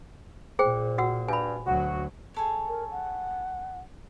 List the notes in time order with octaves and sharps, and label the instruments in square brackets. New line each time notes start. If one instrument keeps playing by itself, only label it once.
[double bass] A#2 [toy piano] G#4 C5 G5
[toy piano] F#4 F#5 E6
[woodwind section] G2 [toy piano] G#5 B5
[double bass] D2 F#3 [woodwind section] F#4
[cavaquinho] G#4 A4 C#5
[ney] A#4
F#5